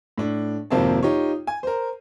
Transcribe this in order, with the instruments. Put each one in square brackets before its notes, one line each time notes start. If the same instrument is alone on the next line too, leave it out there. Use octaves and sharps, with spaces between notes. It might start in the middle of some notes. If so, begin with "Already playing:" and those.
[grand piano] A2 D4
G#1 F2 C3 A#3 C4 A5
D#4 F4 G4 C#5
G#5
A#4 C5